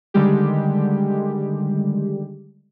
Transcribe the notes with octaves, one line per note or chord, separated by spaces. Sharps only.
D3 D#3 G3 G#3 G4